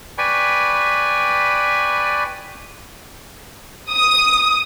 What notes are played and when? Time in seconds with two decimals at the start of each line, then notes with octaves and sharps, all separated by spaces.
0.18 B4 D5 G5 G#5 B5 C#6
3.91 D#6